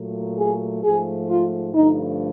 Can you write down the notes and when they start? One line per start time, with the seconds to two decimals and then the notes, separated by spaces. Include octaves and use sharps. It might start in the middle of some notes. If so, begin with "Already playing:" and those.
Already playing: A#2 F#3 A3
0.38 G#4
0.83 G#2 F3 A3 G#4
1.30 F4
1.75 G2 D3 F3 A3 D#4